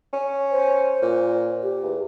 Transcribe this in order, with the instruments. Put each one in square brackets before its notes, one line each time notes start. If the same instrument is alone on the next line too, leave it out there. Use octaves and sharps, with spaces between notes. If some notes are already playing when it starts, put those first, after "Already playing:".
[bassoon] C#4
[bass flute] C5
[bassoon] A#2
[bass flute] G4
[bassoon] E2